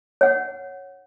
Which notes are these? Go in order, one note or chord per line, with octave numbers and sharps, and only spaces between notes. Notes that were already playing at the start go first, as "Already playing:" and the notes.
C#5 F#5